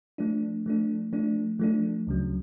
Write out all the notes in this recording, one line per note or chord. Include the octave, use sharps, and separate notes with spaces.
F3 A3 D4
F3 A3 D4
F3 A3 D4
F3 A3 D4
D2 C#3 F#3